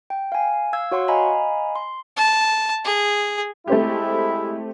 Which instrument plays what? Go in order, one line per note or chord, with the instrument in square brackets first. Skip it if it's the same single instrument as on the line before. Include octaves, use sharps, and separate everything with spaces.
[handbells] G5
F5 G#5
F5 E6 G#6
F#4 C#5 F#5 C6 C#6
D#5 F5 G#5 A#5 B5
C6
[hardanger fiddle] A5
G#4
[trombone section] G#3 E4 [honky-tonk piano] A3 C4 G4